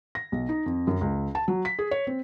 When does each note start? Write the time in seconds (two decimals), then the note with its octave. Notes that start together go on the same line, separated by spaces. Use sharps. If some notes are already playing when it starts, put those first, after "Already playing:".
0.15 A#6
0.32 B1
0.49 D#4
0.66 F2
0.87 F#2
1.01 C#2
1.35 A5
1.48 F#3
1.65 B6
1.79 G#4
1.91 C#5
2.07 C4